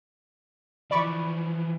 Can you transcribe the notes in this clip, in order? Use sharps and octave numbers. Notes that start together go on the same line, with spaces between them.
E3 F3 D5 B5 C#6